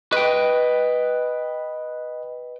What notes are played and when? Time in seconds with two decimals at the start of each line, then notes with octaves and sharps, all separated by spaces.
0.12 B4 D#5 G5